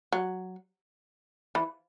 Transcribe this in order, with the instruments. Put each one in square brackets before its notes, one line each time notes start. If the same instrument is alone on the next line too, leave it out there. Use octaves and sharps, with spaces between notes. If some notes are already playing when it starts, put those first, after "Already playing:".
[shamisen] F#3
E3